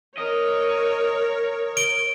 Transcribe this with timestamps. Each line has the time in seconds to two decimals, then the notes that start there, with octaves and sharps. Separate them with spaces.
0.18 A#4 C#5 D#5
1.77 D7 G7